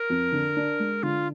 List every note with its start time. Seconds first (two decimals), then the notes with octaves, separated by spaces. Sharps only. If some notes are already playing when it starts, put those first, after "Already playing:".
Already playing: A#4
0.10 F2
0.32 D3
0.56 D4
0.79 G#3
1.03 D3 F4